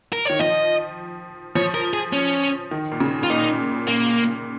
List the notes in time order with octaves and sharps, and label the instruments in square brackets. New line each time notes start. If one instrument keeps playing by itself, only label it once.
[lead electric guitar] A#4
[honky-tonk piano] D#3 [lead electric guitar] C#5
[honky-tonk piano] F3 [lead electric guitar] D#5
[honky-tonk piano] F3 [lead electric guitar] C#5
[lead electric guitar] A#4
G#4
C#4
[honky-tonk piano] D#3
A#2
C#3
[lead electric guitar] F4
[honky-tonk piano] A#2 [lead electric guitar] D#4
[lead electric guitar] A#3